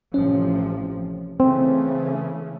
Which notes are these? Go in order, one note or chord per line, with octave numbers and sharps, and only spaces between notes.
A1 C3 F3 C#4
C#3 E3 A3 C4